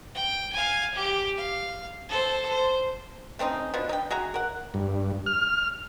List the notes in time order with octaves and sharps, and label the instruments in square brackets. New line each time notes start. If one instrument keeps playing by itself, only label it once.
[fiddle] G5
F5 G#5
G4
F5
A4 C5
C5
[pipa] A3 C4 C#4 D#4
B2 F3 D4
D#4 G5
F#4 G#4 E5 A#5
A#4 F#5
[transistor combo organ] G2
F6